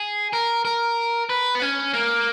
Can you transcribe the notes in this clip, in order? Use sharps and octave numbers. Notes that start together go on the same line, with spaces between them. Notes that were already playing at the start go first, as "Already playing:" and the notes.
Already playing: G#4
A#4
A#4
B4
B3
C#4
A#3